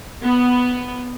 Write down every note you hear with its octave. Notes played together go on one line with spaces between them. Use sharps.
B3